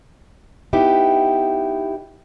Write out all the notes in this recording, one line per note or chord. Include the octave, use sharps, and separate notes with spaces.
B3 D#4 E4 G4